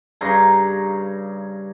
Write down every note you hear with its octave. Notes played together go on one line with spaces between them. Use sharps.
G2 C#3 A#5